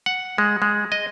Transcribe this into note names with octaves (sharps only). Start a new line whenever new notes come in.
F#5
G#3
G#3
D#5